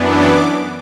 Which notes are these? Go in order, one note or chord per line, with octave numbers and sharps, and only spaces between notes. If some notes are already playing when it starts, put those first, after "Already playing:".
Already playing: F#2 E3 B3 D4
D6